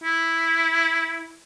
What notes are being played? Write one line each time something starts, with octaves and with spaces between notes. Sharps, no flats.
E4